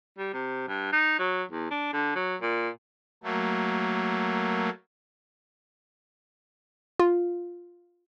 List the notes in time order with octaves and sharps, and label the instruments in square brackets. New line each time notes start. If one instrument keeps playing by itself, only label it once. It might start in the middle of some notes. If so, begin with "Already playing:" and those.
[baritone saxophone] G3
C3
G2
D#4
F#3
E2
D4
D3
F#3
A#2
[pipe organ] F#3 A3 A#3
[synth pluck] F4